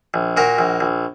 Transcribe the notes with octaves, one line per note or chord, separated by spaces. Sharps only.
A#1
A#2 F#4 A#4
A#1
A#1